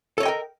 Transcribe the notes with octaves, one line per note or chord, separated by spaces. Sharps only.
A4 A#4 C#5 D#5 G5